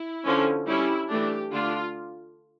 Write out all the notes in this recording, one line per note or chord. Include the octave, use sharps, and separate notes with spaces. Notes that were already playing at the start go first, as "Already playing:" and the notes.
Already playing: E4
D3 F3 C#4
G3 C#4 E4
E3 A3 D4 G4
D3 A3 D4 F4